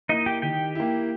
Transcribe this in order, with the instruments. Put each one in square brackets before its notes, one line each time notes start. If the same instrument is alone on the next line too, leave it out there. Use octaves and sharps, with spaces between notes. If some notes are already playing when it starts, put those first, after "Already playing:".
[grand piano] A#3 E4 [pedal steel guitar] D#4 D#5
[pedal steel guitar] G4 G5
[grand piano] D#3 [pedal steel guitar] G4 G5
[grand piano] A#3 E4